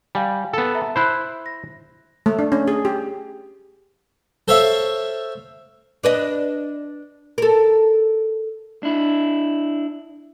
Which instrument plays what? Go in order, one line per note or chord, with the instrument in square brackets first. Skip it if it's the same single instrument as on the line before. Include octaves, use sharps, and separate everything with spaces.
[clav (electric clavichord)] G3 [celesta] F5 G#5
[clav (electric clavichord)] B3 A4
[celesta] E5 A5 A#5
[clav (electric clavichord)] E4 C5 [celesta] B5 F#6
[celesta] A#6
[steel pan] A3
D4
C#4
G#4
G4
[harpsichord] A4 C5 C#5 E5 F5
[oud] D4 B4 D#5
A4 A#4
[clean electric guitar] D4 E4